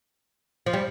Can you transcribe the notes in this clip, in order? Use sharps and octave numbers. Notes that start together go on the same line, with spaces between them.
F3
G3